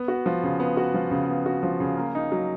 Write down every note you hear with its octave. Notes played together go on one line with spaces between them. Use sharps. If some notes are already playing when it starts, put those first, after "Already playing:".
Already playing: B3
F#4
F3
C#3
B3
F#4
F3
C#3
B3
F#4
F3
C#3
A#3
D#4
F#3